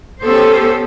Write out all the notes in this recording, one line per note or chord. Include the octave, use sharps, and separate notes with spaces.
B3 C#4 G4 A4 C5